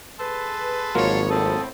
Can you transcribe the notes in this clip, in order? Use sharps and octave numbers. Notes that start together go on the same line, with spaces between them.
G#4 A4 B4 A5 C6
G#1 F#3 G#3 A#3 B3 F4 C#5
A2 B3 C4 A4 A5 D#6